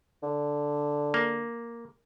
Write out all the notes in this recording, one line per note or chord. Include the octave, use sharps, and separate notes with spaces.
D3
A#3